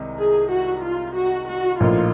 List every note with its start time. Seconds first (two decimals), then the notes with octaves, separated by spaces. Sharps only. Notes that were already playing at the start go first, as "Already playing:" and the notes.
Already playing: C2 C3 D#3 G#3
0.18 G#4
0.51 F#4
0.84 F4
1.15 F#4
1.48 F#4
1.79 A#1 A2 F3 A#3 D#4 F4